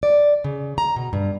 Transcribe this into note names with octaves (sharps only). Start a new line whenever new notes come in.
D5
C#3
A#5
B2
G2